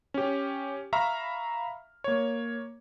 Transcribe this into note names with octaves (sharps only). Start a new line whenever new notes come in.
C#4 G4
E5 F5 A#5 B5 C#6 F6
A#3 C#5